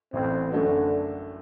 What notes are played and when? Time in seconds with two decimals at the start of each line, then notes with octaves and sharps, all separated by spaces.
0.13 A1 A2 E3 C4
0.52 F#2 D3 F#3 A3 D4 F#4